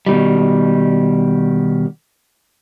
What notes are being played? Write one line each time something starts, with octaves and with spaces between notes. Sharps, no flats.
B2 D#3 G3